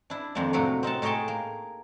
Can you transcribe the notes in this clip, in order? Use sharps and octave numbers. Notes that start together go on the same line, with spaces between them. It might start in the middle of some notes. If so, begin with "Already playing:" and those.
D4 E4
F2 D#3 A#3 D4
A2 C3 F#3 A#3 F#4
C4 D#4 F#5 A5
A2 D#4 G#4 C#5 G5 A5
A#3